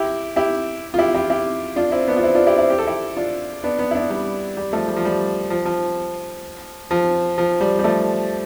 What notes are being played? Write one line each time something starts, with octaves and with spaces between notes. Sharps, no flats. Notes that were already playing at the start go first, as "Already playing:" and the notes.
Already playing: E4 G4
E4 G4
F4
E4 G4
E4 G4
E4 G4
D4 F4
C4 E4
B3 D4
F4
C4 E4
D4 F4
E4 G4
C4 E4
G4
A4
E4 G4
D4 F4
B3 D4
B3 D4
E4
B3 D4
G3
G3
F3 A3
G3
F3
G3
F3
F3
F3
F3
G3
G3
F3 A3